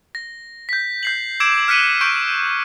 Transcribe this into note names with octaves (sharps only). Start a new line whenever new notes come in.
A#6
G6 B6
G6 C7 F#7
D6 E6 G#6 D7 E7
F6 F#6 B6 C#7 D#7
C#6 G6 D7